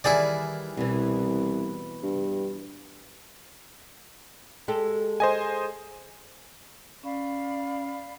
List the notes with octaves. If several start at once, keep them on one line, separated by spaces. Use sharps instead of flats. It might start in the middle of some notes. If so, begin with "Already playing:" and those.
D#3 E3 G3 E4 G#4 D5
C2 B2 E3
G2
G#3 G4 A4
C5 D#5 G#5
C#4 D5 F5 B5